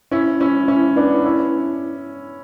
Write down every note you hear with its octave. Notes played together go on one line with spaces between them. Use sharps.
C#4 E4
C#4 E4
C#4 E4
B3 D4
C#4 E4